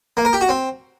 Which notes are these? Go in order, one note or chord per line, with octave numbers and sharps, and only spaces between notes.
A#3
A#4
G4
F#4
C4